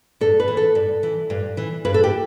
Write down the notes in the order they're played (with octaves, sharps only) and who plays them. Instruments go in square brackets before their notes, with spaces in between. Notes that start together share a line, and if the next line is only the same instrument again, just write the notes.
[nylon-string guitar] G2 A4
B4
E3
A4
G2
E3
G2
E3
G2 B4
A4
G4